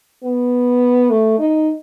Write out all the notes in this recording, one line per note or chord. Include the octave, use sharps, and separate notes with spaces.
B3
A3
D#4